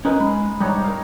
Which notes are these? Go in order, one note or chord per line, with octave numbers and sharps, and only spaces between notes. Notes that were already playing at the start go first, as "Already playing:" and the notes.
C#4 D#4 A#4 B4 D#5
G#3 B5
G#2 B2 G3 D4 D#4 C#5
A#4 F5